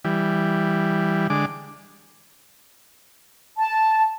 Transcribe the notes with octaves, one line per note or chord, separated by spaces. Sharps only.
E3 G3
D3 G#3 D6
A5